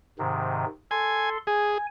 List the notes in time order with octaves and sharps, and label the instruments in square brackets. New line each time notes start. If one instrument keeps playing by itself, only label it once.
[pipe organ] G#2 C3 D#3
[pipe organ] A4 C6 [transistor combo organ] G#5
[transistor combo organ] G#4 [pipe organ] G#5